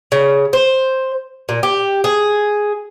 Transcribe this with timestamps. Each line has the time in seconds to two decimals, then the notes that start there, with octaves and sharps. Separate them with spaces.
0.12 C#3
0.53 C5
1.49 A#2
1.63 G4
2.04 G#4